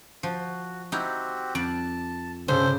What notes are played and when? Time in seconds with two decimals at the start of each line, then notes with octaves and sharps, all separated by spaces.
0.23 F3 F#4
0.92 C4 D#4 E4 F#4 G4
1.55 F2 D5 A5
2.48 G2 C#3 A4 C5 G5